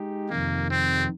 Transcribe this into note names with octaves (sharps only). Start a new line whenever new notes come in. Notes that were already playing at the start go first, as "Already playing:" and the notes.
Already playing: G#3 D#4 G4
F2 C3 D#3 A#3
C4